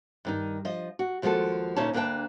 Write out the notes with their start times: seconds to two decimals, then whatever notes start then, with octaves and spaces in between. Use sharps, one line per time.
0.25 G2 D#3 D#4
0.65 F3 D#5
0.99 F#4
1.22 D#2 F3 G#3 F4 F#4 A4
1.76 D2 A#2 C#4 D#4 C#5 A5
1.93 D2 A#3 D4 B4 G5 A5